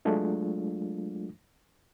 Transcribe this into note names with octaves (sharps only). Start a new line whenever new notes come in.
F#3 G#3 A3 D4 F4